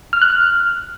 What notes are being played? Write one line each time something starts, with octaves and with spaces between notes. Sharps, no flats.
F6
F#6
F6